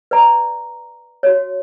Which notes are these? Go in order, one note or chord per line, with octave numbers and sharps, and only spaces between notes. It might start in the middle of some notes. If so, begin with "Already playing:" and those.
B4 D5 A#5
F#4 C#5